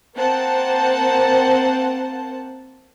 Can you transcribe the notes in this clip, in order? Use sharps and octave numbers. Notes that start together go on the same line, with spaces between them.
A#3 C4 C5 F#5 A5